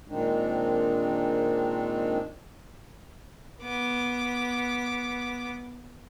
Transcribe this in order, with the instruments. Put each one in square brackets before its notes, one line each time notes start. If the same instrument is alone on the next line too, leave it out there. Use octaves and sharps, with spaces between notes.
[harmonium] A#2 D#3 G#3 C4 D4 D#4
[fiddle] B3 D6